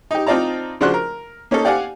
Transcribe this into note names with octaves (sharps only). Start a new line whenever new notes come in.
D#4 G4
C4 D#4 F4 D5 A5 A#5
C#3 F3 D4 F#4 C6 F#6
A#4
A#3 C#4 D#4 A4
G4 D5 F5 F#5 G#5